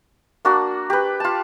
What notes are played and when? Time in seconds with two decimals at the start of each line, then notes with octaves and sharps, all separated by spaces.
0.45 A#3 D4 F#4
0.90 G4 B4
1.20 F4 A5